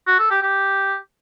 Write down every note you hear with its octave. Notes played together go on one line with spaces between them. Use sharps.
F#4
A4
G4
G4